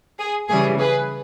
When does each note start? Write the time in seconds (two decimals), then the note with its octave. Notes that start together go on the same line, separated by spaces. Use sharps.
0.18 G#4
0.49 C#3 E3 G3 G#4
0.79 G#4 B4